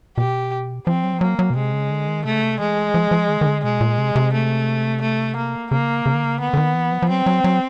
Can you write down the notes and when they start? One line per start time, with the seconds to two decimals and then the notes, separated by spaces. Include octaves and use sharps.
0.17 B2 G4
0.87 F3 C4
1.04 F#3
1.14 F3
1.21 F#3 A#3
1.39 F#3
1.50 B2
1.56 C3 G#3
1.73 C#3
1.90 D3
2.08 D#3
2.25 C3 A3
2.34 C#3
2.42 C3
2.59 E3 G#3
2.94 F3
3.11 F3
3.29 D#3
3.41 D#3
3.47 D3
3.64 B2 G#3
3.81 A#2
3.98 C3
4.16 C3
4.33 A3
5.02 A3
5.36 A#3
5.71 C#3 A#3
6.06 C#3
6.15 D3
6.24 C#3
6.40 D3 B3
6.54 D3
6.57 D#3
6.75 E3
6.92 F3
7.02 F3
7.10 F#3 C4
7.26 F#3
7.44 F#3